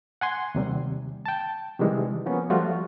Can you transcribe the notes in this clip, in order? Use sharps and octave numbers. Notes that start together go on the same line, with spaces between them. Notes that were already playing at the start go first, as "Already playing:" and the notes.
F#5 G#5 C6
D#2 C3 G3
G5 A5
C3 D#3 E3 G3 G#3
F3 A#3 B3 C#4
F3 G3 A3 F4 F#4